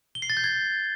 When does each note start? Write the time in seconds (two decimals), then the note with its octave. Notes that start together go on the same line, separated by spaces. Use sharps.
0.15 G7
0.22 C7
0.30 A6
0.37 G6
0.44 G#6